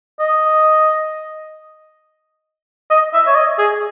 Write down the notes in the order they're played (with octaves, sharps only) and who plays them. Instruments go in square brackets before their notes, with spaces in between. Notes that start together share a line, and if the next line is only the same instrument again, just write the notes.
[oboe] D#5
D#5
E5
C#5
D#5
G#4